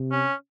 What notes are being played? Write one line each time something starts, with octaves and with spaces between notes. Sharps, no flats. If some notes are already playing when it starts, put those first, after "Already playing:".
Already playing: C3
C#4